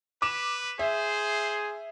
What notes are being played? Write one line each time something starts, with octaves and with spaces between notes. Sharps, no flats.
B4 D6 E7
G#4 C5 E5